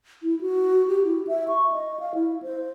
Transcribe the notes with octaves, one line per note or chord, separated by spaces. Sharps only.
E4
F#4
G4
E4
E5
C#6
D#5
F5
E4
C5